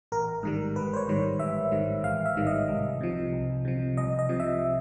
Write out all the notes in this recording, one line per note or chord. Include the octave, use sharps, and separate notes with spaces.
A1 A#4
G#2 D#3 G3
A1 B4
C5
C#5
G#2 D#3 G3
A1 E5
G#2 D#3 G3
A1 F5
E5
G#2 D#3 G3
D#5
C2
C3 F3
C2
C3 F3
C2 D#5
D#5
C3 F3
E5